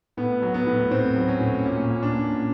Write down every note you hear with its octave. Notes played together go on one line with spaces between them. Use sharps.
A2 B3
F#3
B3
A2
A2 C4
F#3
C#4
A2
A#2 C#4
A#2
D4
A#2